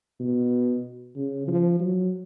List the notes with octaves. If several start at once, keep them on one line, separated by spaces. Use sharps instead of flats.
B2
C#3
F3
F#3